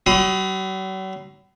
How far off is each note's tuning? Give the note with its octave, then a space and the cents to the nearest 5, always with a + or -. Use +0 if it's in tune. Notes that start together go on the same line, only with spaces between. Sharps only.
F#3 +45 B5 +30 D#6 +25